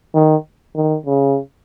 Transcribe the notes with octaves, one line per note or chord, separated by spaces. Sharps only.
D#3
D#3
C#3